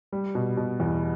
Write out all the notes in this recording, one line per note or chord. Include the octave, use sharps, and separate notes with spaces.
G3
B2
B2
E2